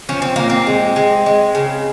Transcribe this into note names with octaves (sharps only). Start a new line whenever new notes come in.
F3 C#4
C4
A#2 A#3
C4
G#3
G#3
G#3
C#3